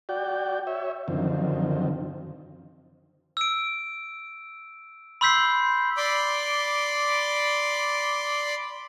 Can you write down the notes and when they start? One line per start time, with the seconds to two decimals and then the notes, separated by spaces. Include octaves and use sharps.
0.09 F#4 D5 G5
0.67 C#5 E5
1.08 F#2 D3 D#3 F3 C4
3.37 E6 D7
5.21 B5 C6 E6 G6 B6 C7
5.97 D5 B5 C6 D6